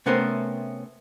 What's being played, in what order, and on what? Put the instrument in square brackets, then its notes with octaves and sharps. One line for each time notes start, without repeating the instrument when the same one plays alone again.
[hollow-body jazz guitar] C3 A3 B3 C#4 A#4 C5